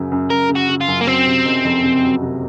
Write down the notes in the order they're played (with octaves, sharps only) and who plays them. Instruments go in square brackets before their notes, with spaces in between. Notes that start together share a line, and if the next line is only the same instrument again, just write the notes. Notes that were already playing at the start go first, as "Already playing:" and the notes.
Already playing: [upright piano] F#2 C#3 F#3
F#2
[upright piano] F#2 [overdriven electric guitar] A#4
[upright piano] C#3
[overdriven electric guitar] F#4
[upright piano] C#3
[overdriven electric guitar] F4
[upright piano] F#2
[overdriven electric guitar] A#3
[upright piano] F#3 [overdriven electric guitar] C4
[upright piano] C3
F#1
F2
C3
F#3
C3